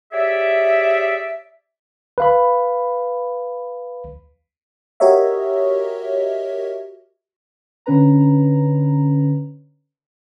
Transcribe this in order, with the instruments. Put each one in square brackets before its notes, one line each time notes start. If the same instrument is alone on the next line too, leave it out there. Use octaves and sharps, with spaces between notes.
[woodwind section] G4 G#4 C#5 D5 E5
[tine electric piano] B4 F5 B5
[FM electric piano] F#4 G4 A#4 C#5 D#5 E5
[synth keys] D3 C#4 B4 A#5